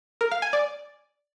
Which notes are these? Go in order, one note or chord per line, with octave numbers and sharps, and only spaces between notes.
A#4
F5
G#5
D5